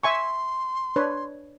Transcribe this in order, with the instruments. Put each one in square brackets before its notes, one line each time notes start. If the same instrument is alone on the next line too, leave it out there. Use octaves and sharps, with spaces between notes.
[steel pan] E5 G#5 C#6 [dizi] C6
[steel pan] D4 B4 C#5